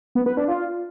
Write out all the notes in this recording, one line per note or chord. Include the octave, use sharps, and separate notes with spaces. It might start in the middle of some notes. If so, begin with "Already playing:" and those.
B3
B4
D4
F4